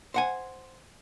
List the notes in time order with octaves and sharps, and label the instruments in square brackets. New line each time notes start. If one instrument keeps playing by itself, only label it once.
[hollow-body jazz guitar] C5 F#5 G#5